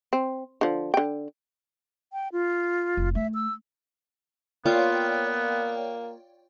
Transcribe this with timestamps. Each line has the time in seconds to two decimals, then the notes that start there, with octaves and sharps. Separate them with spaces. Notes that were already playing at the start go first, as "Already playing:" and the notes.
0.13 C4
0.61 D3 F3
0.94 D3 G5
2.13 G5
2.32 F4
2.97 F1
3.15 A3 E5
3.35 E6
4.66 A#3 B3 F4 C#5 D5 G5